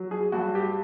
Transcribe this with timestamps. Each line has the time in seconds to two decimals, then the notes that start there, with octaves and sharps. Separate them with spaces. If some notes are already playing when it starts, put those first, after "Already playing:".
Already playing: F#3
0.11 G#4
0.32 G2 F#4
0.55 G4